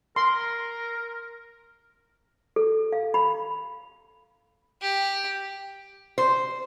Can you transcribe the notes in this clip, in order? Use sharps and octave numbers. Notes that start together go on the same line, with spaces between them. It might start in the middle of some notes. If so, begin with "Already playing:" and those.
A#4 C6
A4
F5
B5
G4
C5